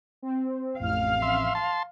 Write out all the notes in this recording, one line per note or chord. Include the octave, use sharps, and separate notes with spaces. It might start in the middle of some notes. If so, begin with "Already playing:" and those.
C4
A1 F2 F5 F6
E5 C6
A5 C6